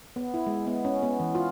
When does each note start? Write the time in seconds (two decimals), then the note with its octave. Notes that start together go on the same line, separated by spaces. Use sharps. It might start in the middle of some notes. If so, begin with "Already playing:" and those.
0.16 B3
0.34 E4
0.47 G#3
0.67 B3
0.85 C#4
1.03 B3
1.20 E3
1.35 F4